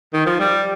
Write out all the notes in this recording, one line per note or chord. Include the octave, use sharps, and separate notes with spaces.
D#3
F3
G3